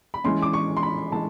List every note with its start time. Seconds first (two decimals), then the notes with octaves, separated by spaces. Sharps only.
0.14 B5
0.24 E3 G#3 C#4 C6
0.42 D6
0.53 C#6
0.77 C6
0.83 B5
1.12 E3 G#3 A5